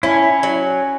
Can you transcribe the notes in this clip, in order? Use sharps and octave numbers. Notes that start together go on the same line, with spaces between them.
C#4 E4
F#3